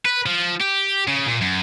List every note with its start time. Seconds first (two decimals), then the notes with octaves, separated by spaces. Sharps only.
0.05 B4
0.26 F3
0.61 G4
1.08 C#3
1.27 A#2
1.41 F#2